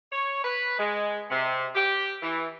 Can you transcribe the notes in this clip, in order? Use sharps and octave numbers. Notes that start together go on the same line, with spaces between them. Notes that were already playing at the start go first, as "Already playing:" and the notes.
C#5
B4
G#3
C3
G4
E3